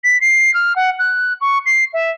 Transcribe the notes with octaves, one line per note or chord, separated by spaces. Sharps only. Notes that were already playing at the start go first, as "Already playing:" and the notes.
B6
C7
F6
F#5
F#6
C#6
C7
E5